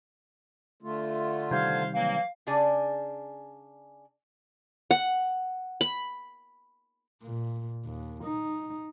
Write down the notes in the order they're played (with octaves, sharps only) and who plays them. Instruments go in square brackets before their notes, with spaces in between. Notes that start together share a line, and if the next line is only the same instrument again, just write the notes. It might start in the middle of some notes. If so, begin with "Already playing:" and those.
[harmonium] D3 A3 F4
[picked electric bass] C3 D#3 G3 [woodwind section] C5 F5 [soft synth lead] G#6
[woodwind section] E3 F#3 A#3 [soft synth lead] F5
[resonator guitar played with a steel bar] C#3 D4 G#4 D5 G#5
[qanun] F#5
B5
[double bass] A#2
D#2
D#4